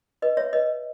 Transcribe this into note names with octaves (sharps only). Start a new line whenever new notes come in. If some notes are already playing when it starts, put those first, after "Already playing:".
B4 D#5
C#5 E5
B4 D#5